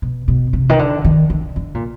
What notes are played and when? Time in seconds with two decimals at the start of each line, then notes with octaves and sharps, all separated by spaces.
0.02 B2
0.28 B2
0.53 C3
0.69 D#3
0.79 D3
1.05 D#3
1.30 D3
1.56 D3
1.74 A#2